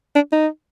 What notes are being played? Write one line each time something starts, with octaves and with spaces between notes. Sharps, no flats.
D4
D#4